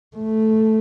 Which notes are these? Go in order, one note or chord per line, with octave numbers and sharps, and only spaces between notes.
A3